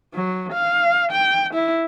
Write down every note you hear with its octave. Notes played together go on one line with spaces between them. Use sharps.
F#3
F5
G5
E4